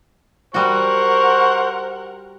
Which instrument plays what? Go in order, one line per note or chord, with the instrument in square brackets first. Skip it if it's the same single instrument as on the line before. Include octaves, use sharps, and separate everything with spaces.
[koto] G3 F#4 [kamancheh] A#4 F#5 [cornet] C5 [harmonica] C#6